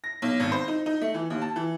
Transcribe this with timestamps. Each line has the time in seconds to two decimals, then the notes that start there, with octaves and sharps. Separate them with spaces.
0.04 A#6
0.22 B1
0.40 G#1
0.52 C5
0.68 D#4
0.86 D#4
1.01 A3
1.14 E3
1.30 D#2
1.42 A5
1.56 E3